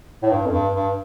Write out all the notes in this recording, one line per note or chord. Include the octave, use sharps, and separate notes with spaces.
A2
G2
F2
G2
G2